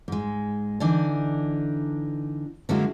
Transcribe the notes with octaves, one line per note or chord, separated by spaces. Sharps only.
G#2 G#3
D3 E3 D4 D#4
D3 F#3 G#3 A#3 C#4 E4